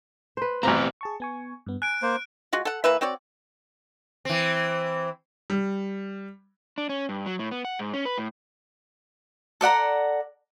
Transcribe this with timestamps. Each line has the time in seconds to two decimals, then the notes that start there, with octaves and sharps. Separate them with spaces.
0.37 B4 C5
0.63 A1 B2 C4 G4 F5 A#5
1.01 G#4 A5 C#6
1.20 B3 G#5 C#6
1.66 G2 B3
1.82 G#5 F#6 D7
2.02 A#3 C5
2.53 G#3 F4 F#4
2.65 A4 F#5
2.84 E3 A#3 B4 E5
3.01 C4 F#4 C#5 D5
4.25 E3 C4
5.50 G3
6.78 D4
6.89 C#4
7.09 G2
7.26 F#3
7.39 A2
7.51 B3
7.65 F#5
7.79 G#2
7.94 C#4
8.05 B4
8.18 A2
9.61 A4 D5 F#5 A#5